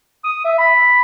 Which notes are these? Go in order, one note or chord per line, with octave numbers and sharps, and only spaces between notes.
D#6
E5
B5